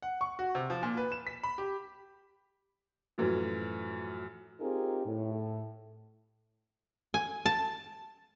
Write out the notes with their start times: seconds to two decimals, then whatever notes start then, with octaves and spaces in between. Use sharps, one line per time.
0.02 F#5
0.21 C#6
0.39 F#4
0.55 C3
0.70 F3
0.83 A#2
0.97 B4
1.12 E7
1.27 B6
1.43 B5
1.58 G4
3.18 F#2 A2 E3 F3
4.60 C4 D#4 F4 G4 G#4 A#4
5.06 A2
7.14 G#5
7.46 A5